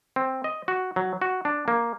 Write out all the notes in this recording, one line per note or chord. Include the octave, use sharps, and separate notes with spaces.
C4
D#5
F#4
F#3
F#4
D4
A#3